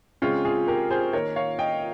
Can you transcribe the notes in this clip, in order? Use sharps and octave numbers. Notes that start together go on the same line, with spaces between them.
C#3 G#3 C4 C#4 F4
F4 G#4
G4 A#4
G#4 C5
D#3 A#3 A#4 C#5
C#5 F5
D#5 G5